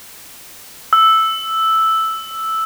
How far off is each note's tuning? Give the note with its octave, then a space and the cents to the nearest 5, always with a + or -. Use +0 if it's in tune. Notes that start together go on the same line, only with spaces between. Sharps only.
E6 -5